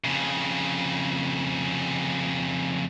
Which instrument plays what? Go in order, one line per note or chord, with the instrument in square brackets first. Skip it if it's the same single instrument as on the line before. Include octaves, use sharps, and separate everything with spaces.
[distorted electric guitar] F2 C#3